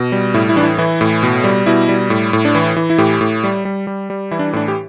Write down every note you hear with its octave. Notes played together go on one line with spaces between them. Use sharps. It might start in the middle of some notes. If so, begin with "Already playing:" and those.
Already playing: B2
G3
A2 E4
E4
E3 D4
E4
E3 E4
A2
B2
G3
B2 E4
G3
A2
A2
D4
E3 E4
E3
E4
A2 G4
A2
G3
G3
G3
G3
E3 E4
D4
A2 D4
G4